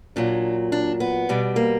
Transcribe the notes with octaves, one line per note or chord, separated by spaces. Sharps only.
A#2 F#3 D4
D4
B3
B2 G3
A#3